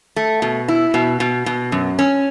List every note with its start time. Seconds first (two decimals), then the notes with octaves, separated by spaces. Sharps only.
0.16 A3
0.42 B2
0.68 E4
0.94 B2
1.20 B2
1.46 B2
1.72 F#2
1.99 C#4